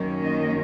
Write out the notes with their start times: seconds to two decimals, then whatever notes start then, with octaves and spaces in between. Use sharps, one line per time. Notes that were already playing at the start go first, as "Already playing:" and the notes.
Already playing: F#2 D#3 A#3 C#4
0.22 D#5